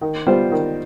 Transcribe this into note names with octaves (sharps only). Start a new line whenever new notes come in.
D#3
G3 B3 F4 C5
D#3